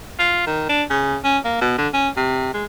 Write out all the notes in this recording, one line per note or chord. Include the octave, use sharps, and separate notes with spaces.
F4
D#3
D4
C#3
C#4
A#3
B2
D3
C#4
C3
G#3